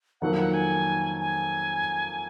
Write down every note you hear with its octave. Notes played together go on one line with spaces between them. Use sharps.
F2 D#3 F#3 A#3 F#5
F#5
G#5
G#5